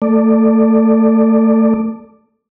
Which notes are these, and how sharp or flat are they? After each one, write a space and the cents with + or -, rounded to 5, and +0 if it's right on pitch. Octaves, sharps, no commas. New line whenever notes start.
A3 +25 A4 +0 D5 +10